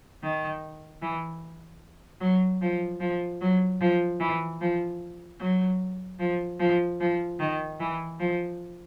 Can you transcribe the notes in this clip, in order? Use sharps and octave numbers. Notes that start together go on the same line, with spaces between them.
D#3
E3
F#3
F3
F3
F#3
F3
E3
F3
F#3
F3
F3
F3
D#3
E3
F3